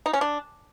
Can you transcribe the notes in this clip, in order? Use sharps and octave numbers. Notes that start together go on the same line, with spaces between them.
D#4
C#4
D4